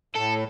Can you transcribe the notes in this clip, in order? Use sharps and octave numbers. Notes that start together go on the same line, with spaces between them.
A2 A4